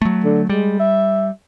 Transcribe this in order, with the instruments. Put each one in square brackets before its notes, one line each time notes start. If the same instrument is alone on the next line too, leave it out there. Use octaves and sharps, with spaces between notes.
[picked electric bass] F#3 A3
[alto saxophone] D3
[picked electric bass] G3 [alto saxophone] G#3
[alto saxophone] E5